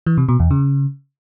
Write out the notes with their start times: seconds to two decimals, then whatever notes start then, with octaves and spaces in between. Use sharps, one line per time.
0.06 E3
0.18 C3
0.29 B2
0.40 E2
0.51 C#3